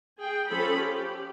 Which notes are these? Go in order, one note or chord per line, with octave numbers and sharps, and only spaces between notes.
G#4 G5
F3 C#4 A4 B5
G4